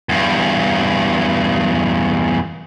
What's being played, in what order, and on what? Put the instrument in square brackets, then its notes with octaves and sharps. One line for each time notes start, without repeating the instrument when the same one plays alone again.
[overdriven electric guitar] E2 G2